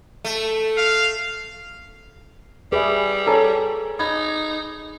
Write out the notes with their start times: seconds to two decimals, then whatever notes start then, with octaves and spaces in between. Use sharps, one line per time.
0.24 A3
0.77 F5
2.72 G3 G#4 B4 E5 D6
3.27 A4 C#5 G#5 A#5
3.99 D#4 B5 G#6